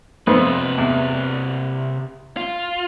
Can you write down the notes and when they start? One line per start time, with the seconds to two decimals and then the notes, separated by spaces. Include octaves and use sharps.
0.27 F2 C3 B3 C4 B4
0.78 E2
2.37 F4